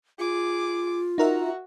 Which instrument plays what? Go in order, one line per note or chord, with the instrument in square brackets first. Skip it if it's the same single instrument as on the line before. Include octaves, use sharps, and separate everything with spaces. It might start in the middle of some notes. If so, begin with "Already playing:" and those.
[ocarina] F4 [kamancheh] G#4 D6
[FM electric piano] D#4 A#4 E5 [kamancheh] F#4